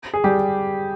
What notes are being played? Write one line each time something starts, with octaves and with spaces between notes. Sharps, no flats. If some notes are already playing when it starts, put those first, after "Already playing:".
G#4
G3 G4